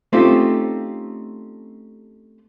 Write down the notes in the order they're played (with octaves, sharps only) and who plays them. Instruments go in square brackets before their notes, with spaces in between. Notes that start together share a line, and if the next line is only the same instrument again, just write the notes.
[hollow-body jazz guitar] A3 C4 C#4 D#4 F4 G4